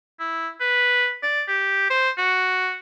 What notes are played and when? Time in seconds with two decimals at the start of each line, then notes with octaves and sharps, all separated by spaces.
0.20 E4
0.61 B4
1.23 D5
1.48 G4
1.90 C5
2.18 F#4